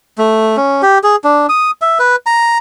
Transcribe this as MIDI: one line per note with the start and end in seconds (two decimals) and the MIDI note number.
0.18 0.57 57
0.57 0.82 61
0.82 0.98 67
1.03 1.16 68
1.24 1.47 62
1.49 1.71 87
1.82 1.98 76
1.99 2.16 71
2.26 2.58 82